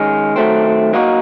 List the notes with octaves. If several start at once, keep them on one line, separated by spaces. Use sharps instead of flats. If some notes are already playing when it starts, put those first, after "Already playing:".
Already playing: D#3 G#3 C#4
D#3 F#3 A3 C4
F#3 A#3 D#4 F#4